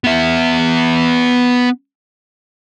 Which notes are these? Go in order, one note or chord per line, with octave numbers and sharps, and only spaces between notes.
B3 E5